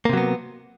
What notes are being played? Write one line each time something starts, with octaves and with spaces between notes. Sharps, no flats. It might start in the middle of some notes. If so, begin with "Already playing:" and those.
C3 F#3 A#3 B3